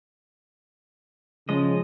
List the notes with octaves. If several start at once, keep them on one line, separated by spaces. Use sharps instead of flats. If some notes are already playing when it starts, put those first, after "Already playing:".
C#3 F3 G#3 D#5